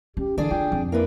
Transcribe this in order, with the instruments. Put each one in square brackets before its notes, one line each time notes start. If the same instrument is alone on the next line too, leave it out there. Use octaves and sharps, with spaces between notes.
[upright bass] C#4 [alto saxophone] G4
[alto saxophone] D3 [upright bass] E3 [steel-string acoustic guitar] D4 G#4 D5
[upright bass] F4 [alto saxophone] G5
[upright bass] F2
[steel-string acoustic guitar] A#3 D4 B4 [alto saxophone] E4